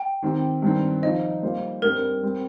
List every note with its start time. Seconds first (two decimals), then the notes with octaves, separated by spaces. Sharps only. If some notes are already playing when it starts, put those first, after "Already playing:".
Already playing: G5
0.22 D#3 C4 G4
0.62 G2 D#3 C4
1.02 F3 D#4 C5 D#5
1.42 G3 A#3 F4 C5
1.82 G2 G3 C4 A#4
2.23 G3 C4